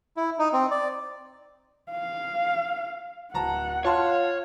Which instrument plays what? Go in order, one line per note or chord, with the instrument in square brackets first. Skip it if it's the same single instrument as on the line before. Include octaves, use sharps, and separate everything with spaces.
[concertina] E4
D#4
C4
D5
[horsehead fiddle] F5
[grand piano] D1 A5 A#5 [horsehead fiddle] F#5
[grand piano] F4 A5 C6 [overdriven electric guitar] C#5 [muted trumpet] F5